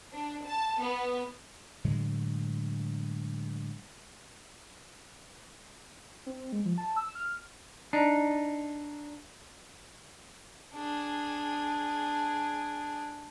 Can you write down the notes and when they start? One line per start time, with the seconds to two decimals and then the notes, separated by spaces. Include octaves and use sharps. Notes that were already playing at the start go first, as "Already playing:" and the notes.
0.13 D4
0.45 A5
0.81 B3
1.84 A2 D3 F#3 G#3
6.26 C4
6.52 G#3
6.65 F3
6.78 A5
6.96 E6
7.15 F6
7.93 D4 D#4
10.74 D4 G#4